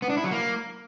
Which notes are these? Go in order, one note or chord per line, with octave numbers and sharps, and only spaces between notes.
B3
D4
E4
F#3
A#3